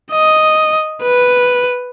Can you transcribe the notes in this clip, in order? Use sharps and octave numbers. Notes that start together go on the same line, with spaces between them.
D#5
B4